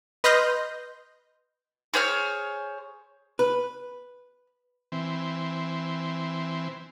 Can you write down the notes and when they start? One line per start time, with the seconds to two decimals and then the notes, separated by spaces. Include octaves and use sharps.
0.24 B4 D#5 C6 F6 G6 A#6
1.94 G#4 C5 C#5 F6
3.39 B4
4.92 E3 C4